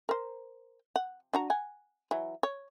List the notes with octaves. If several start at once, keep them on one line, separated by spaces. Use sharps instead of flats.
A#4 C5
F#5
D4 F#4 A#5
F#5 G#5
E3 F#3
C#5